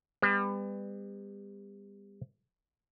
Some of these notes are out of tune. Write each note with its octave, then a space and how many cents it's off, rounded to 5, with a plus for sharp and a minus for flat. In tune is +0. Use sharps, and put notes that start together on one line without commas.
G3 +35 B3 +30